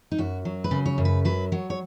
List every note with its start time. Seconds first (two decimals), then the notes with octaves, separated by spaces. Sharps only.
0.11 D#4
0.18 F#2 F#4
0.45 F#3
0.64 B4
0.71 C#3
0.86 C#5
0.98 F#2
1.05 B4
1.25 F#3 B4
1.52 F#3 C#5
1.70 C#5